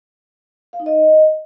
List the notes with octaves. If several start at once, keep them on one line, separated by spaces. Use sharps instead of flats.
F5
D#4
D#5